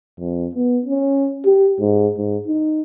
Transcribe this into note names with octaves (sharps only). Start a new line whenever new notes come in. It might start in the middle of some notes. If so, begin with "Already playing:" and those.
F2
B3
C#4
G4
G#2
G#2
D#4